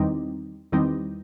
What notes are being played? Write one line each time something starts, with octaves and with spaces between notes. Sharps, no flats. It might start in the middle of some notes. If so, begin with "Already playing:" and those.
Already playing: E2 D#3 G3 C4 D#4
E2 D#3 G3 C4 D#4